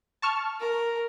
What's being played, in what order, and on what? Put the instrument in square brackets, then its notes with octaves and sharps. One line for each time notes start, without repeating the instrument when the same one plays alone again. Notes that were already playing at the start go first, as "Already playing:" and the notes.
[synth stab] A5 C#6 F6
[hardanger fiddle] A#4